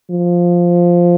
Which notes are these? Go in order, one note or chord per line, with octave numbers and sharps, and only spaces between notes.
F3